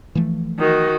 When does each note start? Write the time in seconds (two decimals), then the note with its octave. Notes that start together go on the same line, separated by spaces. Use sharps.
0.15 E3 F3 A3
0.59 D#3 F#4